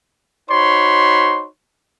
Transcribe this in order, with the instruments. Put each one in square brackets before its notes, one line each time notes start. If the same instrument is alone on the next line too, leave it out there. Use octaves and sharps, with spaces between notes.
[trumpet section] D#4 F#4 C5 C#5 B5 C6